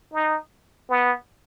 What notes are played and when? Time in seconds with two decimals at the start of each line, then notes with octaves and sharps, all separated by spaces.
0.13 D#4
0.90 B3